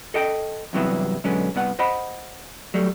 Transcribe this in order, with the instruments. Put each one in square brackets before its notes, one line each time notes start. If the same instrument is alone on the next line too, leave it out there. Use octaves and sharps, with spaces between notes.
[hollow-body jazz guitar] A4 D#5 G5
E2 G2 C3 F#3 B3 E4
B2 D3 F#3 G#3 B3 C#4
C2 G2 B3 F#5
C5 D#5 F#5 B5
F#3 G3 A3